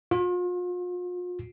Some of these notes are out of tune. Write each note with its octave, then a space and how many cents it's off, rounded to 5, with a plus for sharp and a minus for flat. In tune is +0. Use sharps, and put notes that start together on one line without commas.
F4 +40